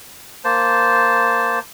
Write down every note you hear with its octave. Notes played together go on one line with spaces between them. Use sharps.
A#3 C5 A5